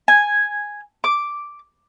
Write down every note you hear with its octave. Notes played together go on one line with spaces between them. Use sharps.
G#5
D6